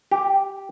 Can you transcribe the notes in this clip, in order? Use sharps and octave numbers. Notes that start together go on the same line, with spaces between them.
G4